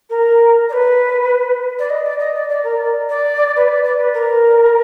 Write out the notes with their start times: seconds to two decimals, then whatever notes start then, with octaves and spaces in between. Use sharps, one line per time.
0.09 A#4
0.69 D5
0.73 B4
1.79 D5
1.90 D#5
2.04 D5
2.19 D#5
2.34 D5
2.49 D5
2.64 A#4
2.78 D5
3.09 D5
3.56 B4
3.68 D5
3.83 D5
3.98 B4
4.14 A#4